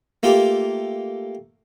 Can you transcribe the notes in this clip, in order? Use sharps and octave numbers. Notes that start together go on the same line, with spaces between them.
A3 A#3 F4 G4